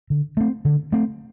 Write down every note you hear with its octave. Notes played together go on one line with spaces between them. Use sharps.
D3
A3 C4
D3
A3 C4